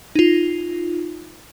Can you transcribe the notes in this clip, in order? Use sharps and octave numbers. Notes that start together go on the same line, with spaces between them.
D#4 F4